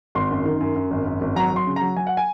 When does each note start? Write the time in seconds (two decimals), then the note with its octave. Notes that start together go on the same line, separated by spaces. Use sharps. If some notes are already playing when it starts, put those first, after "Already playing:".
0.15 G#1 C6
0.31 F#2
0.45 D#3
0.61 F#2
0.75 F#2
0.91 G#1
1.06 F#2
1.21 G#1
1.36 F#3 A#5
1.52 F#3 C6
1.67 C#3
1.76 A#5
1.81 F#3
1.97 F#3 G#5
2.07 F#5
2.17 G#5